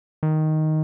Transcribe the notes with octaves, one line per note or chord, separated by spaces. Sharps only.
D#3